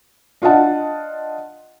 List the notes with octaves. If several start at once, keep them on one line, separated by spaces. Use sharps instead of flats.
D4 F4 D#5 F#5 A5